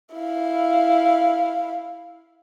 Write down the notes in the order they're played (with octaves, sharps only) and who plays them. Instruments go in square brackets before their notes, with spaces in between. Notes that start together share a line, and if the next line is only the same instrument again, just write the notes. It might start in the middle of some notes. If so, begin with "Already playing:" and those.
[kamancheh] E4 F5